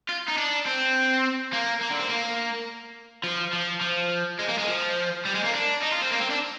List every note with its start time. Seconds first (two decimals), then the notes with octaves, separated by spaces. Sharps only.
0.09 F4
0.28 D#4
0.37 D4
0.66 C4
1.53 A#3
1.81 A#3
1.90 D3
1.99 C4
2.09 A#3
3.24 F3
3.53 F3
3.81 F3
4.39 G#3
4.49 A#3
4.59 G#3
4.68 F3
5.25 G3
5.35 G#3
5.44 A#3
5.54 D4
5.82 D#4
5.92 F4
6.01 C4
6.11 A#3
6.20 C4
6.30 D4